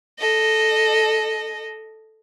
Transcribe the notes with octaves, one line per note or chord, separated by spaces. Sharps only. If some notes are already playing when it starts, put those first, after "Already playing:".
A4 D#5